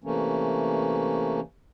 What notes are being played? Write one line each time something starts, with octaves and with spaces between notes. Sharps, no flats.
C3 E3 A3 A#3 C#4